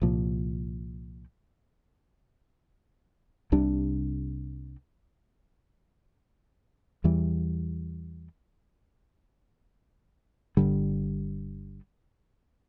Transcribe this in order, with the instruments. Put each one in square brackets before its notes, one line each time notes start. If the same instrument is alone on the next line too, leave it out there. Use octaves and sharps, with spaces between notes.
[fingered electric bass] C2 A#2 F3
C2 C3 G3 D4
E2 E3 G3
G1 G2 D3 G3